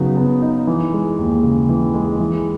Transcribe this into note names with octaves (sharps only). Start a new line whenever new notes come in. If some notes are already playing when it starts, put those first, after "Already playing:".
Already playing: C#3 F#3 B3 D#4
B3
D#4
E3
G#3
D#2
C#3
E3
G#3
E3